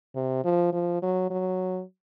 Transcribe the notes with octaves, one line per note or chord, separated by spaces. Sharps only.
C3
F3
F3
F#3
F#3